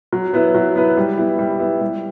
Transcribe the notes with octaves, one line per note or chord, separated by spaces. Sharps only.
F#3
B3 E4 B4
F#3
B3 E4 B4
G3
B3 E4
G3
B3 E4
G3